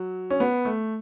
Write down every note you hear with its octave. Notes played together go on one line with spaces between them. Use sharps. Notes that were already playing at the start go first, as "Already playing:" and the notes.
Already playing: F#3
C#4
B3
A3